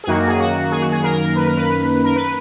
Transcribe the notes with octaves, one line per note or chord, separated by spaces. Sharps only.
G#4
F#2 D#3 A#3 F#4
G#4
F#4
G#4
F#4
G#4
A#4
B4
A#4
B4
A#4
B4